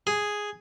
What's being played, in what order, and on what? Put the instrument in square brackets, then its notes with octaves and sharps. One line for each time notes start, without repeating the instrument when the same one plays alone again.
[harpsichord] G#4